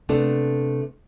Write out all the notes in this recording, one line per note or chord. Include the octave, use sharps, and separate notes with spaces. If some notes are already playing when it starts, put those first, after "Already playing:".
C3 A3 B3 D4 A4